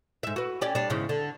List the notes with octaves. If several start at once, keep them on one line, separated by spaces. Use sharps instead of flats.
G#2 E5
F#4 B4
C#4 G4 D5
G3 D4
E2 G#2 C#3
D3